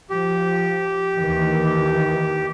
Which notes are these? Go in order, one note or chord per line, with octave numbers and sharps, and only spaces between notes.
F3 G4
D#2 D#3 E3